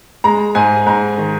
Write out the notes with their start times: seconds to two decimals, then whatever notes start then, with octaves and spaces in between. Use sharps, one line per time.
0.24 G#3 A#5
0.55 G#2 G#5
0.86 G#2 A#5
1.18 D#3